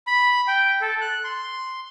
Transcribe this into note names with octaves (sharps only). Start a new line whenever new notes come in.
B5
G5
A4
F#6
C6